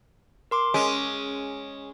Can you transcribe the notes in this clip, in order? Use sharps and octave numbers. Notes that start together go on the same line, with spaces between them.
A#4 C6 D6
G#3 C#4 D7